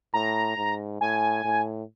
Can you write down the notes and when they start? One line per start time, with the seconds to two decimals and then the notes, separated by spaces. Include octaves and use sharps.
0.14 A2 A#5
0.57 G#2
1.01 A2 G#5
1.44 A2